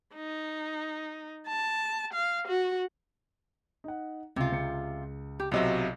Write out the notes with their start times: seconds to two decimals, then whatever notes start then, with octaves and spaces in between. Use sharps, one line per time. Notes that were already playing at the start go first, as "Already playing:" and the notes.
0.15 D#4
1.47 A5
2.13 F5
2.47 F#4
3.84 D#4 F#5
4.36 C#2 C3 F4
4.52 C#2 C#7
5.40 G4
5.51 B1 C3 F#3 F4 D#5 E5